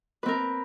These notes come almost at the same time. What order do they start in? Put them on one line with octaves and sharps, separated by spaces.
B4 C4 A#4